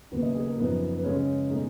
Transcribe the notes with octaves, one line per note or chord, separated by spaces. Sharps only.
D#2 C#3 F#3 B3 B4
D#5
G#4
A#4
F#2 F3 B3 D#4 B4
B4
C#3 G#3 C#4 C#5
B2 G#3 D#4